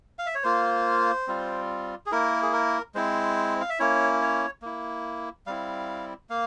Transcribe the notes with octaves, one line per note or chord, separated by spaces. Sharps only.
F5
E5
C#5
A#3 F4 C5
G3 C4 F4
G#4
A#3 E4 A#4
G#4
A#4
G#3 C4 E4 C5
F5
E5
A#3 C#4 E4 C#5
C#5
A#3 E4
G3 C4 E4 F5
A#3 F5